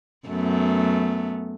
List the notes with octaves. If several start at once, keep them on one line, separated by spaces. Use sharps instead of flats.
F#2 A3 B3